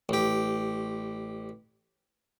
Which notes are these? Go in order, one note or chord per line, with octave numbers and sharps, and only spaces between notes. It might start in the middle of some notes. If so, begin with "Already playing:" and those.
A1 G4